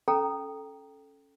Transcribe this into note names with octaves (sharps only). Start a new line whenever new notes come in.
C#4 A4 G5 A#5